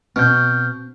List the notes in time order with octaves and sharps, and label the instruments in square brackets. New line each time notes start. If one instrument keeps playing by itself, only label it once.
[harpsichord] B2 [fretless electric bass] C4 [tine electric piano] F6 G6